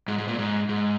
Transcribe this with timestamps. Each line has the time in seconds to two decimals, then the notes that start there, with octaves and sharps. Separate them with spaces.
0.08 G#2
0.18 G#2
0.28 A#2
0.39 G#2
0.69 G#2